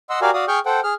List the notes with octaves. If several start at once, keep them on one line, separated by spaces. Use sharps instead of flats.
D#5 F#5 C6 E6
F#4 G4 A#4 D5 F5 G#5
F#4 D5 F5 D#6
G#4 G5 C#6 F6 G6
A4 C5 F#5 G5
G#4 F6